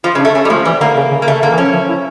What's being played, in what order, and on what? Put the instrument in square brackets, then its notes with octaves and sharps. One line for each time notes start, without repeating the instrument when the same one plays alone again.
[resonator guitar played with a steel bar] F3 [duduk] F4
[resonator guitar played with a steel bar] C#3
[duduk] D4
[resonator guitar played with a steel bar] A3
[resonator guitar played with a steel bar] A3 [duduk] C#4
[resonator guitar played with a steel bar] G3
[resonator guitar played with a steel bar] F3 [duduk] A3
[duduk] E3 [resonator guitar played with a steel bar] G3
[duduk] D3 [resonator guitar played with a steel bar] A#3
[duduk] C#3
C#3
[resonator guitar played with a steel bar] A#3
[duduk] C#3 [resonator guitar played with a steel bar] A3
[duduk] D3 [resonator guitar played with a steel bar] A#3
[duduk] E3
[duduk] F3 [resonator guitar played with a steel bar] C#4
[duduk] F3
E4